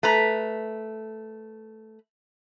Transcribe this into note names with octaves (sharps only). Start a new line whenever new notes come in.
A3 B4 A#5